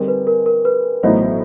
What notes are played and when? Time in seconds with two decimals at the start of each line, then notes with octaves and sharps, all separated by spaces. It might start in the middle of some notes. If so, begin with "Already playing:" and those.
Already playing: D3 G3 C4 D#4 G#4 A#4
0.08 B4
0.27 A#4
0.46 A#4
0.65 B4
1.03 A1 A2 F#3 B3 D#4 C5